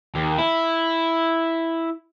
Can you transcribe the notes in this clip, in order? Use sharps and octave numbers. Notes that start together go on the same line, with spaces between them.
D#2
E4